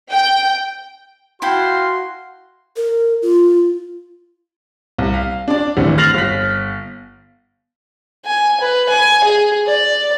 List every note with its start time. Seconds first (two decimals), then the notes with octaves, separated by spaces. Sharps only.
0.10 G5
1.42 E4 F#4 F5 G5 A5 C6
2.76 A#4
3.22 F4
4.98 C2
5.14 F5
5.48 D4 D5
5.77 G#1 D2 A2 D3 E3
5.98 F6 A6 A#6 C7 F7 F#7
6.14 G1 B6
8.26 G#5
8.61 B4
8.89 G#5
9.24 G#4
9.66 D5